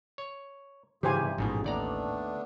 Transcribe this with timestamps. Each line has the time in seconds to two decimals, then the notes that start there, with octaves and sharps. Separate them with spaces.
0.18 C#5
1.03 G#2 C#3 E3 F4 G4 G#4 C5 G#5
1.17 G2 C3
1.38 A1 F2 G#2 B2 G#4
1.64 D#2 A3 B3 D4 D5 A#5